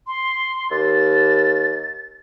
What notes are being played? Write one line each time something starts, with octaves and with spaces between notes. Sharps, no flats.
C6
D#2 A6